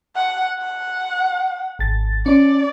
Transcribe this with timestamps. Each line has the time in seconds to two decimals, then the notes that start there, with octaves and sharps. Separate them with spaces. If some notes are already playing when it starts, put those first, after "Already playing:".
0.15 F#5
0.59 F#5
1.79 G#1 A6
2.26 C#4 D5